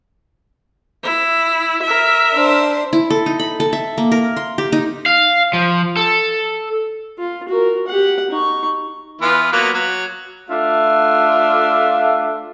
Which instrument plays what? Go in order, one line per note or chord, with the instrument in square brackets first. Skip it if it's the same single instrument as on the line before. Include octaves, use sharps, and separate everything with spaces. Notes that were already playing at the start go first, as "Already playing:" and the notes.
[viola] E4
A#4 E5
[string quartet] D4 C5
[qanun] E4
A4
D#4
B5
A4
E5
A#3
A#4
C6
G4
D#4
[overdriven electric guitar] F5
F3
A4
[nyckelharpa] F4
F#4 A#4
G4 F#5
D#4 C#6
[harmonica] E3 B3 F4
F#3 A#3 B3
F#3
[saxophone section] A3 D4 F4 E5 F5